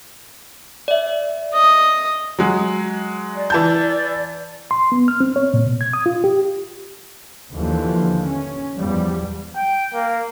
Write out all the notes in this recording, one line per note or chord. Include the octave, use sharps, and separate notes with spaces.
D5 E5
D#5
F#3 G#3
D5
E3 A5 G6
C6
B3
F6
C4
C#5
A#2
B2
G#6
D#6
F4
G4
D#2 D3 E3 F3
C#4
E2 F3 G3
G5
A#3